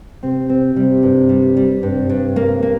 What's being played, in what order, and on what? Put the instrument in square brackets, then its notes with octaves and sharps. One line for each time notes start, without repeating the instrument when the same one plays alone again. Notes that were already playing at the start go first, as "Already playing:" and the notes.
[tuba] C3 [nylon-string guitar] C4
[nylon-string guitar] C4
[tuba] C3 [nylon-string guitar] G3
[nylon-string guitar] G2
G3
G3
[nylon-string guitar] G2 [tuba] C3
[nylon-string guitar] G2
A#3
A#3